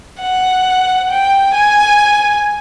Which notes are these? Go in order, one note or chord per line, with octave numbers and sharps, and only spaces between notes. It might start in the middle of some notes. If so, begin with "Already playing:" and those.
F#5
G5
G#5